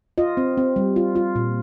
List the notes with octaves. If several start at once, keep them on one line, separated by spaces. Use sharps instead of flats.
F4 D#5
C4
C4
G3
F4
F4
A#2